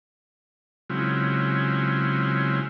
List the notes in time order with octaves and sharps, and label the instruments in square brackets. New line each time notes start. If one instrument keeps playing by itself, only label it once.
[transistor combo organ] C#3 F#3 G#3 C4 E4 F4